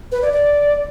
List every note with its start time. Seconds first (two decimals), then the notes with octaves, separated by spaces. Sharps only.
0.12 B4
0.22 D5
0.32 D5